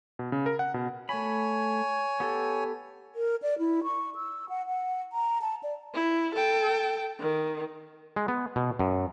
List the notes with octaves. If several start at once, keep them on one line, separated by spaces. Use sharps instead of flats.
B2
C#3
A#4
F#5
B2
A3 C#5 G#5 B5
B3 G4 A4
A#4
D5
E4
C#6
E6
F#5
F#5
A#5
A5
D5
E4
A4 G5
D#3
G#3
B3
B2
F#2